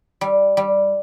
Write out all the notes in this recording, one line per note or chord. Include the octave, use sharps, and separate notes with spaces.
G3
G3